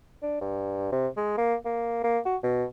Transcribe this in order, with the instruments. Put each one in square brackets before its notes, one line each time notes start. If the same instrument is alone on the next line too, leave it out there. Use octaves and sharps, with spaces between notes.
[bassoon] D4
G2
C3
G#3
A#3
A#3
A#3
F#4
B2